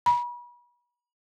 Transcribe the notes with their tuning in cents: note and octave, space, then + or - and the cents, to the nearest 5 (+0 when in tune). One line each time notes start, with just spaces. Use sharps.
B5 -35